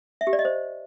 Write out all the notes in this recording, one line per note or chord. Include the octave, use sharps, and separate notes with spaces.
E5
G4
D5
D#5
C5